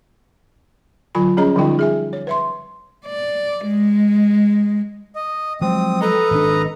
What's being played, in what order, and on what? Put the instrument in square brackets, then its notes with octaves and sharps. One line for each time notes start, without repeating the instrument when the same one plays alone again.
[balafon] D3 F#3 F4 G#5 B5
G3 C#4 G#4 C#5 D#5 A#5
D3 F3 G3 D#4 F4 G5
G#4 E5 G#5
C#5
B4 E5 C6
[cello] D5
G#3
[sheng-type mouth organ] D#5
[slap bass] F3 F#3 G#3 [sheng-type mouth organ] C4 D#6
[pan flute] A4 [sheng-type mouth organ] B4 D#5 A#5
[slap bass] G#1 D4